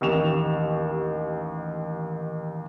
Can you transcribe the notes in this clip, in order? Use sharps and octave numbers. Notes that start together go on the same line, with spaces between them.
A1 D#2 G4 C#6 E7 F7